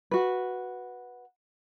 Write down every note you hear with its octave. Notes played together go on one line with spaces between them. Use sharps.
F#4 B4